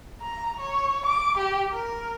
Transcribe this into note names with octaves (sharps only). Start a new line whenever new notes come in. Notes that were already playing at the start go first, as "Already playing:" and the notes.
A#5
C#5
D6
G4
A#4